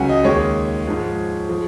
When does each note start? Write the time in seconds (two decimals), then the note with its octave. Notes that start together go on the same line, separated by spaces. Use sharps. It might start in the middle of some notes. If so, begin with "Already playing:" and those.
Already playing: C#2 C#3 F#3 F#5 G#5
0.09 D#5
0.24 D#2 D#3 G#3 C#5
0.87 G#2 F3 G#3
1.49 F3 G#3